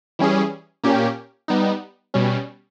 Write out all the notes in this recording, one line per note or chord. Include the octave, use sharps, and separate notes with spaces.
E3 G3 C#4 G#4
A#2 A#3 C#4 G4
G3 B3 D#4
B2 G3 C#4